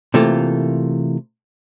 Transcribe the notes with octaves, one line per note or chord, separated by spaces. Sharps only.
C3 E3 A3 A#3 F4 A4